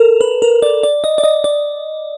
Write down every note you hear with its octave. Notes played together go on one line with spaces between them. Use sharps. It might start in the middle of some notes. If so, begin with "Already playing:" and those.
Already playing: A4 A#4
B4
A#4
D5
D5
D#5
D5
D#5
D5